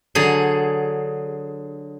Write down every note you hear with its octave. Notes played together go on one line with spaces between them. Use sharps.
D3 F#3 G#4